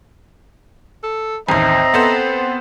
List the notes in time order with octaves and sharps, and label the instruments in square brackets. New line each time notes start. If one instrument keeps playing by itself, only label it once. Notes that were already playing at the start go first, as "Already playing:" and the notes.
[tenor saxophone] A4
[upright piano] A1 D#2 [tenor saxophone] C4 [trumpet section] D#5 E5 A#5
[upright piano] B3 A4 C5